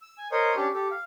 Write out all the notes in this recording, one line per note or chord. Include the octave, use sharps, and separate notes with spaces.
E6
G#5
A#4 C5 C#5 D#5
C#4 D4 G4
G4 A4
F5